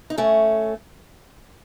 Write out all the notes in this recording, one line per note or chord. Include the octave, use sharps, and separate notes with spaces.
D#4
A3 C#4